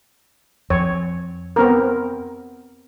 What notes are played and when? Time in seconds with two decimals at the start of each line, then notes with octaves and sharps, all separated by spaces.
0.70 F2 C#5
1.56 B3 C4 A#4